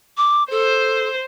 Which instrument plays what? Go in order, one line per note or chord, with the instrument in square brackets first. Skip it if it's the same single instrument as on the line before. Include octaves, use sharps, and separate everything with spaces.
[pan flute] D6
[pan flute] A4 [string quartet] C5